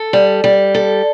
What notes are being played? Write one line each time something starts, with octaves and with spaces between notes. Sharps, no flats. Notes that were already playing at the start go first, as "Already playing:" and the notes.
Already playing: A4
G3
G3
A4